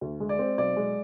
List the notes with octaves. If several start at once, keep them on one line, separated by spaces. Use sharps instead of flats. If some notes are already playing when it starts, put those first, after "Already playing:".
D2
G#3
D5
C4
B1 D5
G#3